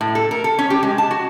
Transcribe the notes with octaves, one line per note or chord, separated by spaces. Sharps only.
A2
A4
A#4
A4
C#4
G4
G#3
A5
F#4